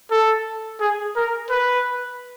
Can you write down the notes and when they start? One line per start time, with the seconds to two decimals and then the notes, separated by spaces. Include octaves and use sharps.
0.11 A4
0.81 G#4
1.16 A#4
1.50 B4